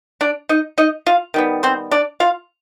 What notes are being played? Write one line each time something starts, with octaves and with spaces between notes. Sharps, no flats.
D4 D5
D#4 D#5
D#4 D#5
F4 F5
D#3 G3 B3
C4 C5
D4 D5
F4 F5